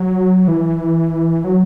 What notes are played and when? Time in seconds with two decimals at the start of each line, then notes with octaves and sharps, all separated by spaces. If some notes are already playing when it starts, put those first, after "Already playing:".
Already playing: F#3
0.48 E3
1.44 F#3